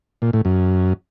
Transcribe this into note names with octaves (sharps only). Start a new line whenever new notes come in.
A#2
A2
F#2